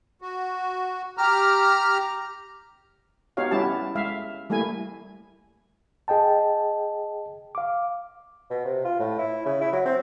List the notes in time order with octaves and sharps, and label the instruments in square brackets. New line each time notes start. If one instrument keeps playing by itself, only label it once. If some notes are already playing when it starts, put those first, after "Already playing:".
[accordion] F#4
G4 A#5 F6
[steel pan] B3 D#4 F#4 G4 C#5 F5
G3 C#4 E4 F#4 G4 A5
G#3 E5 F5
G3 A3 A#3 E4 G#5
[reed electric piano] G#4 D#5 G5 A5
F5 D6
[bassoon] B2
C3
F4
A2
E4
C#3
E4
F#3
C4